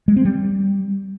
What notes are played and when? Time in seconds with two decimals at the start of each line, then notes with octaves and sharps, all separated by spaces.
0.08 G#3
0.16 C4
0.25 G3